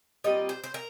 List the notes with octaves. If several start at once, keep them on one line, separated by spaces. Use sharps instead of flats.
A#2 G3 C4 D#5
C5
C5
A#4